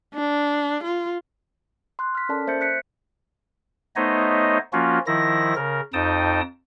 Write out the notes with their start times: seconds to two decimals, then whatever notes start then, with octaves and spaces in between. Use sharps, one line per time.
0.14 D4
0.84 F4
1.99 C6 F#6
2.15 F6 B6
2.29 C#4 A4 A#4 D5 A5
2.47 A#3 C5 E5 G6 A6 C#7
2.61 F#6 B6 C#7
3.96 A3 B3 D#4 C5 C#5 D#5
4.73 F3 A#3 C#4 F4 F#4
5.07 D#3 F3 E4 A#6
5.56 C#3 A#4
5.93 F2 D#4 G5 A5 D#6